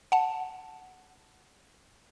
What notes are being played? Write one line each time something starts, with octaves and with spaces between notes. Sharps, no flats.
F#5 A5